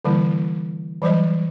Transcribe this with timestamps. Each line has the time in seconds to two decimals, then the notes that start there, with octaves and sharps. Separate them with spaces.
0.05 D3 E3 G3 A#3 E4
1.02 E3 F#3 G3 C5 D#5